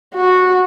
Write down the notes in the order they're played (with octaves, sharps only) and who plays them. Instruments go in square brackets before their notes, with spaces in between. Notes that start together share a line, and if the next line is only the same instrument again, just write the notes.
[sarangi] F#4